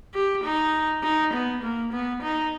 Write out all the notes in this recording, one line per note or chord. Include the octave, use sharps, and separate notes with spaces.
G4
D#4
D#4
B3
A#3
B3
D#4